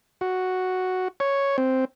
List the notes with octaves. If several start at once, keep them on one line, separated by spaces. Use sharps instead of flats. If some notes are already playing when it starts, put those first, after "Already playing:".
F#4
C#5
C4